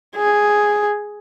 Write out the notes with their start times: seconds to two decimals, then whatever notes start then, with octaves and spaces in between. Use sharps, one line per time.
0.16 G#4